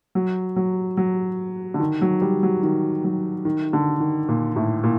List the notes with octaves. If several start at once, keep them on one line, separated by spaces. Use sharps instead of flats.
F#3
F#3
F#3
D3
D#3
F#3
G3
F#3
D#3
F#3
D#3
D3
D#3
A#2
A2
A#2